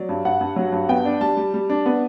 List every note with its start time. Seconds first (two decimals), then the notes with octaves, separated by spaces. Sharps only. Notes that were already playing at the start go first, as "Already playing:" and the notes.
Already playing: F#3 D5
0.09 G2
0.25 G2 F#5
0.41 G2
0.56 F#3
0.72 G2
0.89 B3 G5
1.05 D4
1.21 G3 A5
1.37 G3
1.54 G3
1.70 D4
1.86 B3